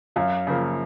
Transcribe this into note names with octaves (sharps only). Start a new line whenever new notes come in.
F#2 F5
C#3 F3 A#3